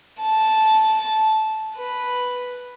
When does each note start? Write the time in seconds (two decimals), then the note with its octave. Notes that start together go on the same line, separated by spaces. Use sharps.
0.21 A5
1.77 B4